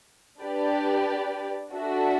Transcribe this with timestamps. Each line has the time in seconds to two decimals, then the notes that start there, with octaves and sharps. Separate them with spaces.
0.41 D4 G4 B4 D5
1.73 D4 F#4 A4 E5